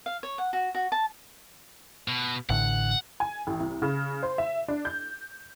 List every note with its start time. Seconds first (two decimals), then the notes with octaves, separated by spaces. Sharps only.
0.06 F5
0.23 C#5
0.38 F#5
0.53 F#4
0.75 F#4
0.92 A5
2.08 B2
2.50 A1 A2 D3 F#5
3.20 G#5
3.47 A1
3.60 C2
3.82 C#3
4.23 C5
4.38 E5
4.68 D4
4.85 G6